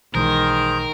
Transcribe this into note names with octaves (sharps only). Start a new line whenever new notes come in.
B1 D#3 E3 G#3 G#4 A#4 C5